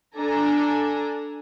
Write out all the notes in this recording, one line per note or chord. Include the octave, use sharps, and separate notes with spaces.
D4 A4 G#5 A#5